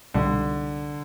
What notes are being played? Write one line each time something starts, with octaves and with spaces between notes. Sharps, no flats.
C2 B2 D3 G3